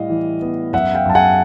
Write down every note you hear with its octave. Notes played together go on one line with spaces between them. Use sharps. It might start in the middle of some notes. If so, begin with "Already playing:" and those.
Already playing: A2 G3 D#5 F5
E3
B3
F#2 E5 F#5
F5 G5
F#2 A5
F#5 G#5